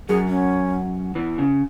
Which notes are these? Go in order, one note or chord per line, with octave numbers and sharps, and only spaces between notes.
F#2 F#3 G#4
C#4
E2 E3
C#3